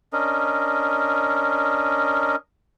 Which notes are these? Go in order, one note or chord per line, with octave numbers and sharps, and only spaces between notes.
C#4 D4 A#4 D#5